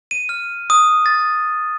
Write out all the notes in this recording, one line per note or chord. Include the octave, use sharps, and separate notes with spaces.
D#7
F6
D#6
A6